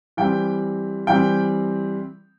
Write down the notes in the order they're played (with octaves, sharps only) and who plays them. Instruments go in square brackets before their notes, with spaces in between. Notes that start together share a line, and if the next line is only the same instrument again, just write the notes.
[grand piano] E3 G3 C4 G5
E3 G3 C4 G5